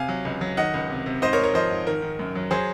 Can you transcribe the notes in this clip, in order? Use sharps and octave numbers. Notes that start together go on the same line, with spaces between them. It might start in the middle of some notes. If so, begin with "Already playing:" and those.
Already playing: C3 F5 G#5
F#3
C#2
F#3
D#3 D#5 F#5
C#2
C3
C3
G#2 C5 D#5
A#4 C#5
G#2
A#4 C#5
F3 C5 D#5
G#2
D#3 A#4
D#3
F#2
F#3
F#3 G#4 C5